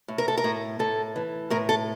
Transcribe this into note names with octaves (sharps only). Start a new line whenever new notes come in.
A2
A#4
A4
A#4
A2
A2 A4
E3
A2 A#4
A4